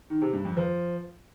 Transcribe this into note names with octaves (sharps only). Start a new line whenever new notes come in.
D#3
C3
G2
F2
F3